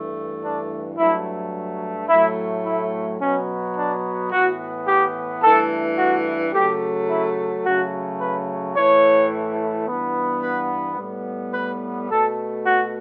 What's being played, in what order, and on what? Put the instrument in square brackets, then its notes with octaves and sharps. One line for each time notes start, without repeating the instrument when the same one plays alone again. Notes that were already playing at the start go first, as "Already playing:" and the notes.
Already playing: [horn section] G2 E3 A3
D4
G2 F#3 A3 E4
A2 F#3 A3 E4
E4
B2 F#3 B3 C#4
D4
A2 E3 B3 F#4
G4
G2 E3 A3 A4
F#4
C#3 F#3 A3 G4
E4
C#3 F#3 A3 F#4
B4
A2 E3 A3 C#5
G2 E3 B3
B4
A2 G3 B3
B4
B2 A3 A4
F#4